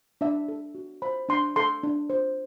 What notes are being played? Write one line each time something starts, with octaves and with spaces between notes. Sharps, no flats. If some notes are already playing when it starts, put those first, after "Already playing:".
D4 E5
A4
F#4
C5 B5
D4 C6
A4 C6
D4
C5